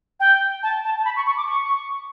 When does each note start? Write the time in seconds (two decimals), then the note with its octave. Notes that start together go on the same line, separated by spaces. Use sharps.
0.20 G5
0.63 A5
0.84 A5
0.98 A5
1.05 B5
1.16 C#6
1.26 C#6
1.37 D6
1.48 C#6